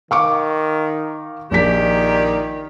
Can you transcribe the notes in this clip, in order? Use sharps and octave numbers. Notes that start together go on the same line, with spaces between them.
D#3 F5 C#6 D6
A#1 A#2 D#3 G4 D5 B6